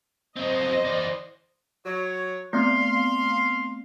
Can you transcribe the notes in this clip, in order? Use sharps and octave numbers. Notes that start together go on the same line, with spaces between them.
F#3 C4 C5 D#5
E3 D5
F#3 C#5
A3 B3 C4 F5 C6